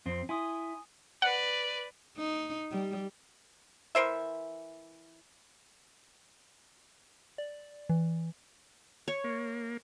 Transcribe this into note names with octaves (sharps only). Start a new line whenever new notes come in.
F2 C4
E4 G#5 C6 D#6
B4 D5 F#5
D#4
G3
E3 A#4 C5 E5
D5
E3
C#5
A#3